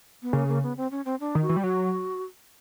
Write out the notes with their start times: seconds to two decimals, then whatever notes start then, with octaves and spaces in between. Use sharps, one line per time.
0.22 B3
0.33 C#3 A#3
0.48 A#3
0.63 B3
0.77 C4
0.91 C#4
1.05 C4
1.20 D4
1.35 D#3
1.42 F#4
1.49 E3
1.56 G3
1.63 F#3 F#4